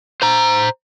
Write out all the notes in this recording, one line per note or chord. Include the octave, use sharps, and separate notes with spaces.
C5 A#5